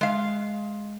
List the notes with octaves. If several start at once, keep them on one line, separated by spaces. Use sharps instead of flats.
G#3 F5